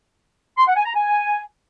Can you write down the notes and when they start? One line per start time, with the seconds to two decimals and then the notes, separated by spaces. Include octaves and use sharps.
0.58 C6
0.67 F#5
0.76 G#5
0.86 A#5
0.95 G#5